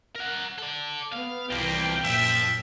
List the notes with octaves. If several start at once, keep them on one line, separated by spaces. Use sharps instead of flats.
A#4 F#5
A4 D5
B3 F5
C2 E3 F3 G3 A#3 G5
F#2 A#2 F3 E5